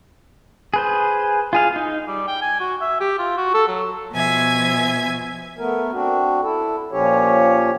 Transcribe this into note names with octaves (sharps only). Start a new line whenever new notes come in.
G#4 B4 C5
F4 G#4 F5
D#4
G3
G5
G#5
F#4
E5
G4
F4
F#4
A4
F#3
B2 F3 E5 G#5 G#6
A3 B3 A#4
C4 D4 F#4
E4 A4
A#2 F3 C#4 G4 C#5